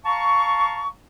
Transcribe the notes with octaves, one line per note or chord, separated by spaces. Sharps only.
F5 A5 A#5 C#6